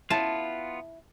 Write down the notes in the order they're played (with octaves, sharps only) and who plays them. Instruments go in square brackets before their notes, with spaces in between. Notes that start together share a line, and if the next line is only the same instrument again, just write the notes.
[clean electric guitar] B3 F4 [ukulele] E4 [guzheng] A5